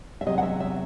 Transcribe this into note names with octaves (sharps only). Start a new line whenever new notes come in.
E5
E2 C3 F#3 D#5
F#5
E5
E5